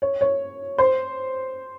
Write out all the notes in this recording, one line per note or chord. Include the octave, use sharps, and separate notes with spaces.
C#5
C#5
C5